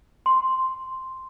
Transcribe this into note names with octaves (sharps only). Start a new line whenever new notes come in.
C6